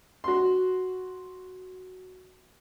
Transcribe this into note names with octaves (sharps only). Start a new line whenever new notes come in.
F#4 C6